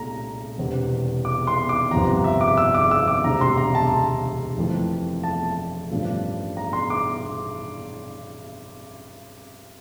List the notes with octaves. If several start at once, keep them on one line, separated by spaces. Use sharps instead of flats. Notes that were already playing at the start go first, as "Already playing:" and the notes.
Already playing: C2 A#2 A3 A#5
E1 E2 C3
D6
C6
D6
G1 F2 C3 A#5
E5
D6
E6
D6
E6
D6
E1 D2 C3 A#5
C6
A#5
A5
F1 F2 E3 A3
A5
A1 G2 F3 A3
A#5
C6
D6